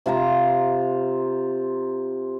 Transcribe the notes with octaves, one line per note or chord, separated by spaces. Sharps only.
C3 F4 C5 A#5